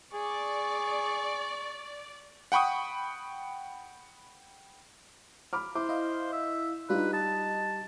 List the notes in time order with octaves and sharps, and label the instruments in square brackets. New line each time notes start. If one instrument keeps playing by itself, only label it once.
[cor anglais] G#4 [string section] D5 [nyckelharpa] C#6
[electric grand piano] F#5 G5 B5 C#6 D#6
[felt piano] B5 D6 F6
[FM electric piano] E4 [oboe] C5 [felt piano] D6
[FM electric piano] E4 D#5 F5
[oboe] E5
[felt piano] G3 D#4 [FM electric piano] D4 F4 [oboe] B4
[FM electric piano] D#5 [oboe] A5